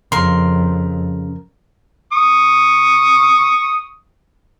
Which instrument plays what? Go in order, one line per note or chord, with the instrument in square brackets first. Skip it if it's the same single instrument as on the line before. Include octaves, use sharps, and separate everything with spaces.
[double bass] F2 [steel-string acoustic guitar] C#3 [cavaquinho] A#4 C6
[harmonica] C#6 D#6